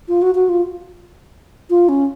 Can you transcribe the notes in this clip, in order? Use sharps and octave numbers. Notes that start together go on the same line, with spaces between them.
F4
F#4
F#4
F4
F4
C#4